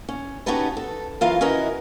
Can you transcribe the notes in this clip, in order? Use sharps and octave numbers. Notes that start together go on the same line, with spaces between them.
C#4
C#4 D#4 F#4 G4 A4 B4
A4
F#2 E3 F4 A#4 F5
C#4 E4 F#4 A#4 B4 D#5